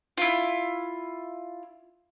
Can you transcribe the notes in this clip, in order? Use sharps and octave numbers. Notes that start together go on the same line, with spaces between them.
E4 F4